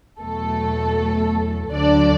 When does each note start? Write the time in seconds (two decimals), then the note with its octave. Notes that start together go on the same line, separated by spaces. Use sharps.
0.20 E2 B2 F#3 A3 A4
1.72 D2 D3 F#3 D4 D5